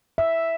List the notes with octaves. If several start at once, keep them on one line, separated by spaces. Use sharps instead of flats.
E5